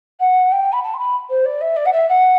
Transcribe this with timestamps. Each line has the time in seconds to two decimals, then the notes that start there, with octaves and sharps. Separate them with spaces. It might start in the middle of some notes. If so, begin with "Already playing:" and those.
0.20 F#5
0.52 G5
0.72 B5
0.83 A5
0.94 C6
0.98 B5
1.29 C5
1.45 D5
1.61 E5
1.76 D5
1.85 F#5
1.93 E5
2.09 F#5